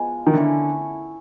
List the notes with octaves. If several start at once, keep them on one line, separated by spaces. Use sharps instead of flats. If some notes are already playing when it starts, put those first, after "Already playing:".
Already playing: F3 G#3 B3
D#3
D3 A3 C#4 E4